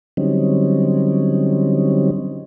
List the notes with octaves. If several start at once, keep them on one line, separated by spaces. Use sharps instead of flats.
D3 F#3 G3 C4 C#4 D#4